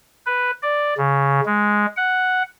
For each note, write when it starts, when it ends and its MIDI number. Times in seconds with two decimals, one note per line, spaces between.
0.26 0.51 71
0.63 0.94 74
0.97 1.40 49
1.46 1.86 56
1.96 2.42 78